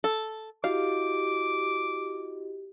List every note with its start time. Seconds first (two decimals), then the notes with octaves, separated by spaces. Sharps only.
0.04 A4
0.64 E4 F#4 G4 D#5 F5 D6